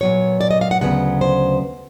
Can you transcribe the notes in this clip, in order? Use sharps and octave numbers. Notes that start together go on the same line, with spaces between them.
A#2 F#3 B3 C#5
D5
D#5
F5
F#5
D2 C#3 F#3 B3 F#5
C5